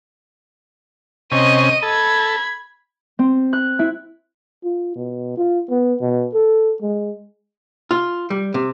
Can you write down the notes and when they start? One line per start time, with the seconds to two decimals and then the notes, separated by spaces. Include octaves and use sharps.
1.32 C3 C#4 D#5 D#7
1.83 A4 B5 G#6
3.19 C4
3.53 F#6
3.79 E4
4.64 F4
4.96 B2
5.37 F4
5.70 B3
6.01 B2
6.34 A4
6.82 G#3
7.91 F4
8.30 G3
8.54 C3